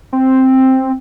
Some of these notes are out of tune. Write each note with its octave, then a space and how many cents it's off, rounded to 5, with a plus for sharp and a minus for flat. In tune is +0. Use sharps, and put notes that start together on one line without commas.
C4 +5